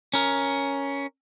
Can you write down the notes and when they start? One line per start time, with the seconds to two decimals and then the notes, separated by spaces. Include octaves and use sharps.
0.14 C#4 A#4